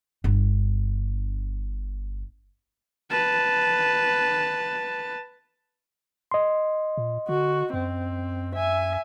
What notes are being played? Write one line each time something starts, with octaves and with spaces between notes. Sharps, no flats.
G1 D4
B4 A5
D#5 C6
A#2
D3 F#4
F#2 C4
E5 G#5